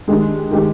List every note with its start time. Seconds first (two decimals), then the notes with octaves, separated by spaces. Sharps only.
0.08 D#3 G#3 D4 G4
0.51 D#3 G#3 D4 G4